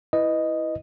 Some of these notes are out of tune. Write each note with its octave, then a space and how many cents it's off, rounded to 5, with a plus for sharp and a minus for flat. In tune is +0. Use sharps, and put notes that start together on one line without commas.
E4 +0 B4 +0 D#5 -5